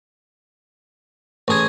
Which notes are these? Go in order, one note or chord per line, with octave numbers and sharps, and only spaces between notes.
A1 G#4 C#6 G#6